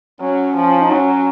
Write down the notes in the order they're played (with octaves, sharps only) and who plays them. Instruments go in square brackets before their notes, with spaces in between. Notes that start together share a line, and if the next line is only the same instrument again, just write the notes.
[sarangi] F#3 [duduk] C#4
[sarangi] F3
[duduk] D#4
[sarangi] F#3 [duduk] C#4